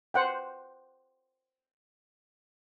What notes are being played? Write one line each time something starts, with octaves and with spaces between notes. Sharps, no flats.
C5 F#5 G5